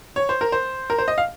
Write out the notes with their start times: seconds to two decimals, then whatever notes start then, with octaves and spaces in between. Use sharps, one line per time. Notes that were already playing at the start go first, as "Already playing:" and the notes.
0.16 C#5
0.29 C5
0.41 A#4
0.52 C5
0.90 A#4
0.98 C5
1.08 D#5
1.18 F5